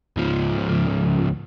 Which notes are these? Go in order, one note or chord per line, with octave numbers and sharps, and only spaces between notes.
C#2 F3